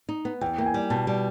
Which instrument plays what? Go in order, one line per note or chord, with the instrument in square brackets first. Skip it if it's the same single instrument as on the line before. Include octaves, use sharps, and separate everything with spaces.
[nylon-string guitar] D#4
B3
[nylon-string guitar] E2 [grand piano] G5
[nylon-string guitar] A#3 [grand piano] G5
[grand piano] G#5
[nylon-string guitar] G3
[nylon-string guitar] B2 [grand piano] A5
[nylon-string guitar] G3